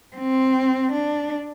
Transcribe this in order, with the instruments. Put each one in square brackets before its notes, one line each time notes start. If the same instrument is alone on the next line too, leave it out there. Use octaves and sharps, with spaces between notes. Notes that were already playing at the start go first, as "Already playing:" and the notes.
[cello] C4
D4